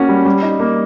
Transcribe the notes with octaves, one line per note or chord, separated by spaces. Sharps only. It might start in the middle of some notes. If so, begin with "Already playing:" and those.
Already playing: A#3 C#4 F#4
G3
G3
D#4
A#3